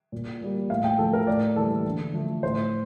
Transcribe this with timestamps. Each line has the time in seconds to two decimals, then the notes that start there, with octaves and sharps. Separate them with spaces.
0.12 A#2
0.41 G3 A#3
0.70 A2 F5
0.84 G5
0.98 F3 A3 A4
1.13 A#4
1.27 A2 D5
1.56 E3 G3 A#3 A4
1.85 D3
2.13 F3 A3
2.43 A2 C5